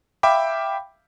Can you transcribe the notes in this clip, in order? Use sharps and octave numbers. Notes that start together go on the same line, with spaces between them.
E5 F5 G5 B5 D6